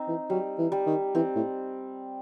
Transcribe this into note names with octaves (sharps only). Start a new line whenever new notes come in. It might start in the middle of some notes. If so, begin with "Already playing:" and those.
Already playing: C4 D#4
E3
F#3 G3
E3
G3
D#3
E3 C4
A2